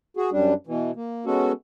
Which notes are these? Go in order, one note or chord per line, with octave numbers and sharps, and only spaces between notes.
F#4 G#4
F#2 G3 D4
B2 E3
A#3
G#3 B3 C#4 F#4 A4